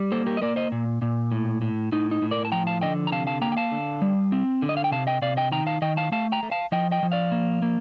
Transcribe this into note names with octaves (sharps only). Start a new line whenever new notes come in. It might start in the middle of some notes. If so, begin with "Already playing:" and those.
Already playing: G3
A#3 A4 C5
G4 A#4
D#5
A#3 A#4 D5
C5 D#5
A#2
A#2
A2
A2
A2 D#4
D#4
A2
A#4 D5
A5
F3 G5 A#5
F5 A5
D3 D#5 G5
A#5
C3 F5 A5
F5 A5
A#3 G5 A#5
G5
F5 A5
D3
G3
C4
D3
D#5
F5
G5
C3 F5 A5
D#5 G5
C3 D5 F5
D#5 G5
D#3 G5 A#5
F5 A5
D#3 D#5 G5
F5 A5
A3 F5 A5
G5 A#5
A3
F5 A5
F3 D#5 G5
D#5 G5
F3
D5 F5
A#3
A#3